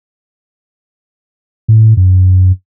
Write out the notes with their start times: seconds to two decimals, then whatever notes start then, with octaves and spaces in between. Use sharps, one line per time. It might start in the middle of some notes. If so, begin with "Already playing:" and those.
1.68 A2
1.97 F#2